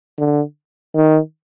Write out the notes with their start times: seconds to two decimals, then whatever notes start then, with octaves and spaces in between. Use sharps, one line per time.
0.18 D3
0.95 D#3